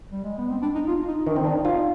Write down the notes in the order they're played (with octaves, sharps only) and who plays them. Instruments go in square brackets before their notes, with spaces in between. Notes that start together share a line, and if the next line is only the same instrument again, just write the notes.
[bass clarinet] G3
G#3
B3
C4
D4
D#4
F4
D#4
[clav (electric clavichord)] D#3 [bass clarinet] D4
[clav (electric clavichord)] C4
[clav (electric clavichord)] D4 [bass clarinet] D#4
[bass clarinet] D#4 [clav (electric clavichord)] F4